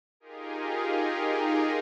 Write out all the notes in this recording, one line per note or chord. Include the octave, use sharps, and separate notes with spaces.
D#4 F4 G4 G#4 A#4